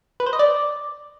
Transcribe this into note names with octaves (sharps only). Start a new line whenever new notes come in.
B4
C5
D#5
D5